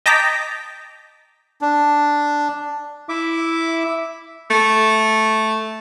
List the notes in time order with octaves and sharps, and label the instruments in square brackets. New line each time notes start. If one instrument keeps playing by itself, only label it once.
[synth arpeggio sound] D#5 G5 A5 A#5 D6 B6
[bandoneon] D4
[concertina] E4 E5 D6
[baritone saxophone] A3